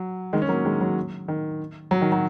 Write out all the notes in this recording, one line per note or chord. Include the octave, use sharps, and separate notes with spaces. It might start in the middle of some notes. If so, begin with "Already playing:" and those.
Already playing: F#3
D#3 G#3
C#4
F#3 A#3
D#3 G#3
F#3
D#3
F#3
D#3
F#3